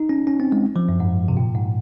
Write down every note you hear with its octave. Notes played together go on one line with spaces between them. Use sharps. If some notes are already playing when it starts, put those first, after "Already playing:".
Already playing: D#4
C#4
C#4
C4
G#3
F3
F#2
G#2
C3
A#2
G#2